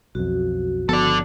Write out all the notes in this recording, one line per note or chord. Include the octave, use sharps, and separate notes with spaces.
B1 F2 F#4
G1 F3 B3 A4 D5